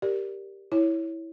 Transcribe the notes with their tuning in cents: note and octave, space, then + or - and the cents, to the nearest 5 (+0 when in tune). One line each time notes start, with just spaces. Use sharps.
G4 +0 A#4 +0 D5 +0
E4 -5 C#5 +0